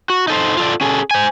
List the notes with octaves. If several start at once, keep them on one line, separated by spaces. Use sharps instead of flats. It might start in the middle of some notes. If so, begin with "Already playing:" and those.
F#4
D#4 A4 C5
F4 A4 D5
C#4 G#4 A4
C5 G#5